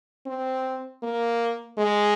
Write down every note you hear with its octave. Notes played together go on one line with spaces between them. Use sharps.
C4
A#3
G#3